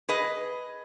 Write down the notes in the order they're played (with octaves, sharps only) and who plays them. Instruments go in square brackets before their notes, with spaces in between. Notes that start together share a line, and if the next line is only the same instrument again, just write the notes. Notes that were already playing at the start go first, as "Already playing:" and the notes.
[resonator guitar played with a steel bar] G#4 B4 D#5